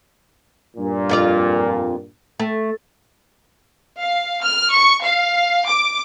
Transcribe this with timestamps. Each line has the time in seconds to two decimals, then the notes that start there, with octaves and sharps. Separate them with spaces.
0.77 G2 A#2
1.09 F2 F4 D5
2.39 A3
3.98 F5
4.43 F6
4.73 C#6
5.03 F5
5.66 D6